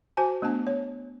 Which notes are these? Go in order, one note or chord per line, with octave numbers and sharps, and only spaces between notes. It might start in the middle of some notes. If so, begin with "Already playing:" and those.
F#4 C5 G#5 A5
A3 B3 D4 A5
C#5